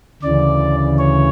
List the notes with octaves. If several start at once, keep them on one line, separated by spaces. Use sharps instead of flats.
D2 C#3 E3 D5
C#5